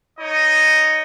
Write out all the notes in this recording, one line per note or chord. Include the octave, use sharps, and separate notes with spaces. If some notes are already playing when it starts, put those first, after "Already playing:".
D#4 C#5 D#5